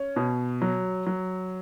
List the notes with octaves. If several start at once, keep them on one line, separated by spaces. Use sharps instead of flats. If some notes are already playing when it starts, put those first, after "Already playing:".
Already playing: C#4
B2
F#3
F#3